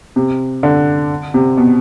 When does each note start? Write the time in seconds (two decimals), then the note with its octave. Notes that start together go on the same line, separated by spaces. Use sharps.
0.16 C3
0.63 D3
1.34 C3
1.57 B2